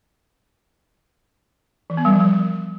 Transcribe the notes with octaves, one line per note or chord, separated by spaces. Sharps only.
E3
B3
G3
F3
G3